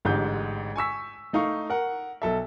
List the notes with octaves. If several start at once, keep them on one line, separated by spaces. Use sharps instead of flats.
A1 G#2 D3 G4 G6
G#5 C#6 E6 B6
A3 D#4 F5 C#6
A#4 F#5
B1 A4 E5